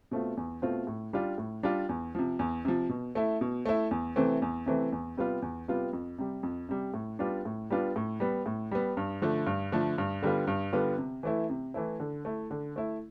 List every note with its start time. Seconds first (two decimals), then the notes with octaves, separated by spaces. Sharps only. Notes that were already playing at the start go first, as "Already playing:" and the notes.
0.11 B2 A3 C4 F4
0.37 E2
0.62 B2 A3 C4 F4
0.87 A2
1.13 G3 D4 F4
1.38 A2
1.63 G3 D4 F4
1.89 E2
2.15 C3 F3
2.39 E2
2.65 C3 F3
2.89 B2
3.15 A3 E4
3.41 B2
3.65 A3 E4
3.91 E2
4.16 C3 E3 A3 C4
4.42 E2
4.66 C3 E3 A3 C4
4.92 E2
5.17 C3 G3 B3 F4
5.42 E2
5.68 C3 G3 B3 F4
5.93 F2
6.18 C3 G3
6.43 F2
6.69 C3 G3
6.94 A2
7.19 G3 B3 D4 F4
7.45 A2
7.70 G3 B3 D4 F4
7.96 A2
8.20 G3 B3
8.46 A2
8.71 G3 B3
8.97 G2
9.22 D3 F3 A3
9.46 G2
9.72 D3 F3 A3
9.98 G2
10.22 D3 G3 B3 F4
10.47 G2
10.73 D3 G3 B3 F4
10.98 C3
11.23 E3 A3 E4
11.50 C3
11.74 E3 A3 E4
12.00 D3
12.25 A3 E4
12.51 D3
12.76 A3 E4